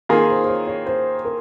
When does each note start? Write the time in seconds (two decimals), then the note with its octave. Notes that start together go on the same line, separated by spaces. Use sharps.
0.09 D#3 A#3 F4 G#4 A#4
0.29 C5
0.44 C5
0.48 C#5
0.67 C#5
0.86 C5
1.25 A#4